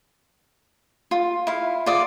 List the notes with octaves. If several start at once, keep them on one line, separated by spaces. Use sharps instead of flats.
F4
E4 F5
F4 D5 D#6